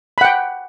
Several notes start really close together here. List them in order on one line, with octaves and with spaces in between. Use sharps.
B5 F#5 G5